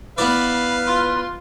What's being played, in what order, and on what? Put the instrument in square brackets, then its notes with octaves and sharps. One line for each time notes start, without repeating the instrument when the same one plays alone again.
[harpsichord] B3 E4 D5 [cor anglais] B4 [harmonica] F5 [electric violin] B5
[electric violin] F4 C6